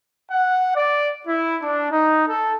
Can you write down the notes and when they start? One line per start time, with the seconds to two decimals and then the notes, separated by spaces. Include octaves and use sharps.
0.31 F#5
0.76 D5
1.27 E4
1.62 D4
1.91 D#4
2.29 A4